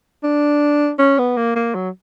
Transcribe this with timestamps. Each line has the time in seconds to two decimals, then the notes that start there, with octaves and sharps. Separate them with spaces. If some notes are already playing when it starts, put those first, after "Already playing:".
0.24 D4
0.99 C#4
1.19 B3
1.37 A#3
1.56 A#3
1.75 F#3